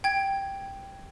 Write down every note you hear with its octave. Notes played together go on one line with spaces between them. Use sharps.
G5 G#6